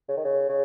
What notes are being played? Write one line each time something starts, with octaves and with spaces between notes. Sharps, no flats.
C#3
D#3
C#3
C#3